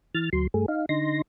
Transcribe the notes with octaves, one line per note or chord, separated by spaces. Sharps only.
E3 F6 A6
D2 F#3 C6
G2 A3 G#4
D#4 F5
D3 D#4 C6 A#6